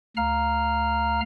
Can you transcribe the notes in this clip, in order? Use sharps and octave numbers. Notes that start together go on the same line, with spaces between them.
D2 F5 A#5 F6